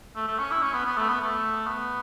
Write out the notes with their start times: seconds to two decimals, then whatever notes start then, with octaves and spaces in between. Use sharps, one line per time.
0.16 A3
0.27 A3
0.39 C#4
0.51 E4
0.62 C#4
0.74 B3
0.85 B3
0.97 A3
1.09 B3
1.21 A3
1.66 B3